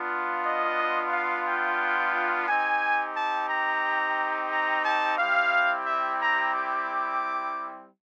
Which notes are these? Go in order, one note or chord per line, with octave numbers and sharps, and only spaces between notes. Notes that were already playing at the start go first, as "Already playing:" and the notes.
Already playing: B3 D4 F4
D#5
F5
G5
C4 D#4 G4 G#5
A5
A#5
A#5
A5
G3 C4 E4 G4 F5
E5
A#5
D6